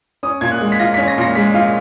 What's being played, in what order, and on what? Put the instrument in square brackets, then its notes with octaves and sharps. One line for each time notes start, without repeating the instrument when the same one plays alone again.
[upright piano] C#4 D#6
A#2 G#6
F#6
G#3
B6
F4 A#6
C#4 B6
A#6
A#2 A#6
G#3 B6
F4